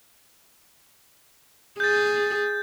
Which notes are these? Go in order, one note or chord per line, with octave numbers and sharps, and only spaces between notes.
G#4 G6 A6